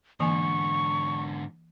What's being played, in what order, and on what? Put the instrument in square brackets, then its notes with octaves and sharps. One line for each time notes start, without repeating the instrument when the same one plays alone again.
[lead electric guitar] G#2 D3 [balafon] E3 A#3 G#5 [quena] C#6